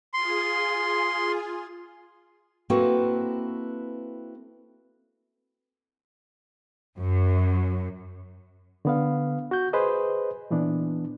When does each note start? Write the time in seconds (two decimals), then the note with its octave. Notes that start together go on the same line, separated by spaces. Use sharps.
0.14 F4 G#4 C6
2.70 A#3 C4 E4 F#4 A4 B4
6.99 F#2
8.85 D3 B3 F5
9.51 F#4 G6
9.73 G#4 B4 C5 D#5
10.51 A#2 E3 B3 D4